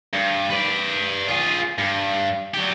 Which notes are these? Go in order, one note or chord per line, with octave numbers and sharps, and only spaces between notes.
G2
B4 D5
F4 G#4
G2
F#3 G4